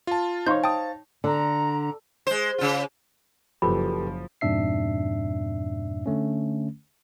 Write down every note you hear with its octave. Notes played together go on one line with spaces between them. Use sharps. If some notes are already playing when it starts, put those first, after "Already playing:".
F4 A5
D#4 C5 C#5 F5 C6 G6
G5 A5 D#6
D3 A#5
G#3 C5
C#3 F4
F#1 F3 G4 A4 B4 B5
F2 G#2 B2 D4 E5 C7
D3 A3 C#4